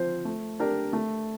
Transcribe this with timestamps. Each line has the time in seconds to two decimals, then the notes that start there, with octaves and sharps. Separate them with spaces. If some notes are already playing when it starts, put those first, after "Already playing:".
Already playing: F3 C4 F4 C5
0.25 A3
0.60 D4 G4 A#4 D5
0.93 A3